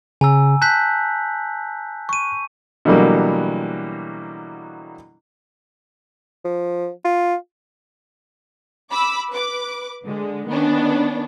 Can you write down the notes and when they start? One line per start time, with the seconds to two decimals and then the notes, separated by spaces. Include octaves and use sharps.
0.21 C#3 G#5 A#5 E6
0.62 A5 F#6 G6 B6
2.09 C#6 D#7
2.85 B2 D3 E3 F#3 G3 A#3
6.45 F3
7.05 F4
8.90 B5 D6 E6
9.29 B4 D6
10.05 D3 G#3
10.48 D#3 B3 C#4 D4